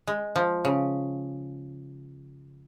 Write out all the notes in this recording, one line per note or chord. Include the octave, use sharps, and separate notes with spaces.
G#3
F3
C#3